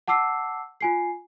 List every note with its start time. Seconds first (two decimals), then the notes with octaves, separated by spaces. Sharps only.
0.08 F#5 A5 D6 E6 C7
0.81 F4 G#5 C7